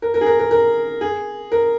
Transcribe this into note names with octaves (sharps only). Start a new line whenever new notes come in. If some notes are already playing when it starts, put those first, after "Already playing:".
A#4
A#4
G#4
A#4
A#4
A#4
G#4
A#4